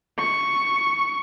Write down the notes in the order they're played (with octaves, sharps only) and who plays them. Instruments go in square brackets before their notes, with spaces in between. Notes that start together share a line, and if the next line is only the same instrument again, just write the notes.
[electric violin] C#6